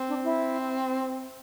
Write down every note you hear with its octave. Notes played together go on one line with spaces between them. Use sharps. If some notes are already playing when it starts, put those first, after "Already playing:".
Already playing: C4
D4
E4